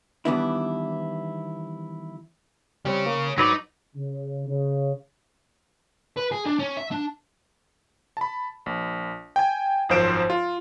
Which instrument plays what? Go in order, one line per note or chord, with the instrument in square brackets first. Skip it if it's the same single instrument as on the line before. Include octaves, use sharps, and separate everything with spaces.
[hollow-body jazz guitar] D#3 E3 G3 B3 D4 E4
[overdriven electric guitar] C#3 C#5 [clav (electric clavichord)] G3 C4
[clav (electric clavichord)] A#3
[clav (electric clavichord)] G#2 [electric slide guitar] F#3 B4 D5 [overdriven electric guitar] D#4
[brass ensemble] C#3
C#3
[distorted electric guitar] B4
G#4
D4
C#4
E5
D4
[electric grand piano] A5 B5
A#1
G5 G#5
G#1 F#2 F3 C5 D7 E7
F4